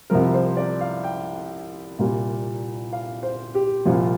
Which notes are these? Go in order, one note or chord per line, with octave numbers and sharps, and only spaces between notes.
C2 C3 F3 A#4
C5
D5
F5
G5
C2 A#2 G3
F5
C5
G4
C2 A#2 F3 F4